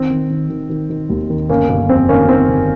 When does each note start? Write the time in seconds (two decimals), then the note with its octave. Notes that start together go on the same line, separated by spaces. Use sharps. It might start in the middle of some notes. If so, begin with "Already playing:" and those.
Already playing: D#3 C4
0.10 D#3
0.30 D#3
0.50 D#3
0.70 D#3
0.90 D#3
1.10 D#2
1.30 D#3
1.49 G1 A#3 C#4
1.69 G1 A#3
1.89 F2 C4
2.09 D#3 A#3 C#4
2.29 D#3 C4
2.49 G1